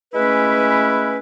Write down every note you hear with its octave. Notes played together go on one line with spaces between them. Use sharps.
G#3 A3 C#4 E4 B4